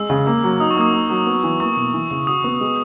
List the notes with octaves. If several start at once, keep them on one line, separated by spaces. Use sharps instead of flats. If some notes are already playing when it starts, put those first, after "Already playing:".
Already playing: G#3 E6
C#3
A#3
F#3
D#4 D#6
C#6
A#3 D#6
A#3
F#3
B3
E3
A#3 C#6
B2
E3
C#3
F#4 D#6
B3
G#3